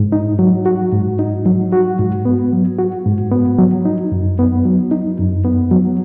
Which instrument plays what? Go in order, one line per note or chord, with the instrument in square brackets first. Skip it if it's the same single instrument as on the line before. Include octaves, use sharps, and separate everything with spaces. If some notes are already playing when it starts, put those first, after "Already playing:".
Already playing: [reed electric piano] G#2
D#4
F#3
F#4
G#2
D#4
F#3
F#4
G#2
B3
F#3
F#4
G#2
B3
F#3
D#4
F#2
B3
F#3
D#4
F#2
B3
F#3